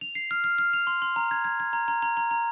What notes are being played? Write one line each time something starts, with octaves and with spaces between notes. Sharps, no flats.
F7
C7
F6
F6
F6
F7
C6
C6
A#5
G#6
G#6
G#6
A#5
A#5
A#5
A#5
A#5